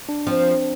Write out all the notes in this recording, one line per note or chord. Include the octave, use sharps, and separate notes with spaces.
D4
F3 C4